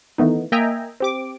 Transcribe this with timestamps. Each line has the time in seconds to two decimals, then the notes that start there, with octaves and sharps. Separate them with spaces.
0.18 D#3 E3 A3 B3 D#4
0.52 A#3 D#5 E5 G5 G#5 A#5
1.00 C4 G4 D6